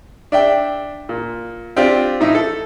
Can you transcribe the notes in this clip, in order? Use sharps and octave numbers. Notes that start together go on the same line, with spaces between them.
D4 E5 G5
A#2
C4 D4 F4 G4
A2 D#4 E5
A4